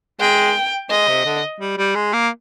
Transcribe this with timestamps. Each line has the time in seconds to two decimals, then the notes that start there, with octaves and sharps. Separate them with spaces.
0.20 G#3 G5
0.90 G#3 D#5
1.08 C3
1.25 D3
1.60 G3
1.78 G3
1.95 G#3
2.13 A#3